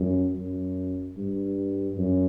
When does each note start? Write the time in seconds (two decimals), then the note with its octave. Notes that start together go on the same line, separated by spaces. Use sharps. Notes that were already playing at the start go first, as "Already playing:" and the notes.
Already playing: F#2
0.36 F#2
1.17 G2
1.98 F#2